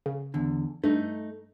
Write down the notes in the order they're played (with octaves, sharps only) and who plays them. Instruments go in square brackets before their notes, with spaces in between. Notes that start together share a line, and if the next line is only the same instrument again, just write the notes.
[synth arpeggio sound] C#3
[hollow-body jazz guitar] E2 D3
[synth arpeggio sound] G2 [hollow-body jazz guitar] A3 D#4